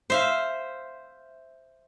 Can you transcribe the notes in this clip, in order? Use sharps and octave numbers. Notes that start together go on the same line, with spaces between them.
C5 E5 F5